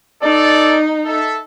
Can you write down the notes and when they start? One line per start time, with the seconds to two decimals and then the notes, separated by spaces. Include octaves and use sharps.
0.22 D#4 A4 D5
1.06 A4 E5